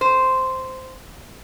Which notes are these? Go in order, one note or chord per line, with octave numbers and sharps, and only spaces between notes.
C5